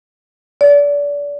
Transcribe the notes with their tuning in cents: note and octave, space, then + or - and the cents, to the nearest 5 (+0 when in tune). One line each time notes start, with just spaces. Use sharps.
D5 -30